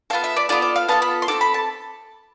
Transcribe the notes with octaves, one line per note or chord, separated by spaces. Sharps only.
B3 F4 A4 F5
E5
D5
B3 F4 A4 D5
D5
F5
B3 F4 A4 A5
B5
C6
C4 F4 A4 D6
B5
A5